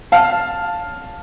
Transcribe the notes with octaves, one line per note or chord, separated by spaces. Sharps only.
F5 A5